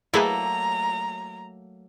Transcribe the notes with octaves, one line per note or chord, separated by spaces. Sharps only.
F#3 A3 A#3 E4 G#4 B4 A#5